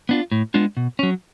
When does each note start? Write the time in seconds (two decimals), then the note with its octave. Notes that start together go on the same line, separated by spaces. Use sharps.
0.09 B3 D4 F4
0.32 A2
0.54 G#3 B3 D4 F4
0.77 B2
0.99 F#3 C#4